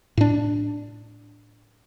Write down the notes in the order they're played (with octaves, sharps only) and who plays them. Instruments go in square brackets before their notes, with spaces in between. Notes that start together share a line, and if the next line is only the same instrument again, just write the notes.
[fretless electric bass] A2 D4